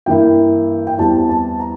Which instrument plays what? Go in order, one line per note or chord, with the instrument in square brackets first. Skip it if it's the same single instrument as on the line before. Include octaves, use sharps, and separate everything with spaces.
[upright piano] G2 E3 A#3 E4 G5
G5
E2 E3 G3 C4 A5
A5
A#5